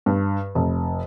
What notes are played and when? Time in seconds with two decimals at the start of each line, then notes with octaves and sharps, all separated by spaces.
0.06 G2
0.55 F1